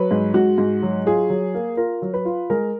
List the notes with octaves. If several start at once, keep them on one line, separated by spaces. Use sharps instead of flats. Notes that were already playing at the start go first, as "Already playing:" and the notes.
Already playing: F#3 B4
G#2
G#2 F#4
G#2
F#3
F4 G#4
F#3
A#3
F4 A#4
F#3
B4
F4
G#3 A#4